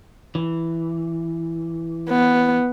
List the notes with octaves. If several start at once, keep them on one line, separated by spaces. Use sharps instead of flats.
E3
B3